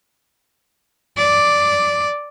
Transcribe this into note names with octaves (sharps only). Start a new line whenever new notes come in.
D5